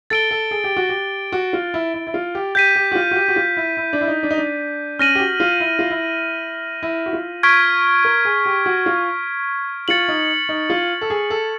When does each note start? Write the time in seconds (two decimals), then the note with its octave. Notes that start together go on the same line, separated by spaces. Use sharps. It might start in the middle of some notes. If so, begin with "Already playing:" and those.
0.10 A4 A6 D7 G7
0.31 A4
0.51 G#4
0.64 G4
0.77 F#4
0.89 G4
1.32 F#4
1.53 F4
1.74 E4
1.94 E4
2.07 E4
2.14 F4
2.35 G4
2.55 G4 G6 B6 D#7
2.76 G4
2.92 F#4
2.95 F4
3.11 F#4
3.16 G4
3.28 F#4
3.36 F4
3.57 E4
3.77 E4
3.93 D4
4.01 E4
4.08 D#4
4.23 D4
4.31 D#4
4.38 D4
4.99 C#4 F6 A#6 D#7 F#7
5.15 G4
5.20 F#4
5.40 F4
5.60 E4
5.79 F4
5.90 E4
6.83 E4
7.06 F#4
7.13 F4
7.43 C#6 F6 G#6 B6 D7
8.05 A#4
8.25 G#4
8.46 G4
8.66 F#4
8.86 F4
9.88 F4 A6 C#7 F#7
10.08 D#4
10.49 D#4
10.70 F4
11.01 A4
11.10 G#4
11.30 A4